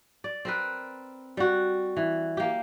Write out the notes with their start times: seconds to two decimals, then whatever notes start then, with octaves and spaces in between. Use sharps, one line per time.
0.24 D5
0.45 C4 A#4 B4
1.37 G3 F#4
1.97 E3
2.37 A#3 G4